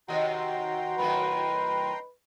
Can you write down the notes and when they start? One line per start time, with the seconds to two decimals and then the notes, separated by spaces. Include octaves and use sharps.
0.08 D#2 C3 F#4 D#5 G5 A#5 C6
0.98 F#2 A2 D#3 B4